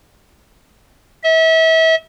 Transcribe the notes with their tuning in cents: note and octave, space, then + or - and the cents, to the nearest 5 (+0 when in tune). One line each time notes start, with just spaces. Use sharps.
E5 -35